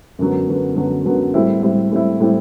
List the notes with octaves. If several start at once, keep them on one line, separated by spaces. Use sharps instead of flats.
F#2 D3 F#3 B3
F#2 D3 F#3 B3
F#2 D3 F#3 B3
F#2 D3 F#3 B3
A2 G3 C4 E4
A2 G3 C4 E4
A2 G3 C4 E4
A2 G3 C4 E4